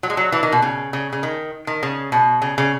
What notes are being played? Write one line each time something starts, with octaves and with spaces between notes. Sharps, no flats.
F#3
G#3
F#3
E3
D#3
B2
C#3
C#3
C#3
D#3
D#3
C#3
B2
C#3
C#3